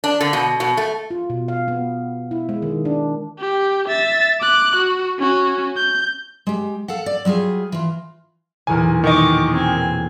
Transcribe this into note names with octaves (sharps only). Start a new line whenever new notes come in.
D4
D3
B2
B2
A3
F4
B2
F5
B3
E4
G#3
D#3
D4
G4
E5 A6
D6 F#6
F#4
C#4 F#4
G6
G#3 G4
A4 F5 F#5
D5
F#3 G3 F4 G#4
E3 F4
B1 E2 A#2 G#5
D#3 D#5 C#6 D6
C4 G#5